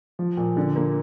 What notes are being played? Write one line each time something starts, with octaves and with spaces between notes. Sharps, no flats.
F3
A#2
D3
A#3